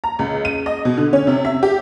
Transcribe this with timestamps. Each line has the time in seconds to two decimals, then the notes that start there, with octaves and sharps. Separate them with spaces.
0.04 A#5
0.19 C#2
0.45 D#7
0.66 D#5
0.85 B2
0.98 D3
1.13 C#4
1.27 C3
1.45 E5
1.63 G4